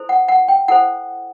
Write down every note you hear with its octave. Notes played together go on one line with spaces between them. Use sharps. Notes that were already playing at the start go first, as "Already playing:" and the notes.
Already playing: E4 A4 C5
F#5
F#5
G5
E4 A4 C5 F#5